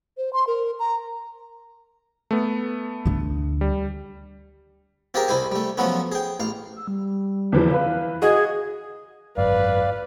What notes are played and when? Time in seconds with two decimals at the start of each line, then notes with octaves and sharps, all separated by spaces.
0.18 C5
0.33 C6
0.47 A#4
0.79 A#5
2.31 A3 B3
3.06 D2 D3
3.61 G3
5.14 C4 F4 G4 G#4 A#4
5.28 C2 E4 C5 G#5
5.52 G3 A3
5.78 F3 F#3 A3 B3 C#4
6.12 G#4 G5
6.40 A1 F5
6.76 E6
6.87 G3
7.52 E2 E3 F3
7.71 E3 B4 F5
8.22 F#4 G#4 D#5 G#6
9.38 G#1 F#2 B4 D5 F5